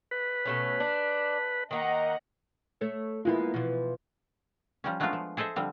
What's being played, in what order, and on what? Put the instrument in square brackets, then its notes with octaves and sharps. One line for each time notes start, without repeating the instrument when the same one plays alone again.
[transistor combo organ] B4
[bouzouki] B2 A3 C#4
D4
[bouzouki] D#3 A#3 [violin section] D#5 F#5 A#5
[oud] A3 A4 C#5
[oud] G#3 A#3 B3 [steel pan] E4 F4
[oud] B2 E3 F3
[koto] F3 G3 C#4
F#3 G#3 A3 B3 D4 F4
F3
G#4 A4 C5 D#5 E5
D3 F3 G3 C4